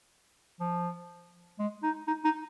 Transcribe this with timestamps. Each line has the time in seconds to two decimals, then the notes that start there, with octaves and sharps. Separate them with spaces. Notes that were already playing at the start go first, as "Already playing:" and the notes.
0.60 F3
1.59 G#3
1.83 D#4
2.07 D#4
2.25 D#4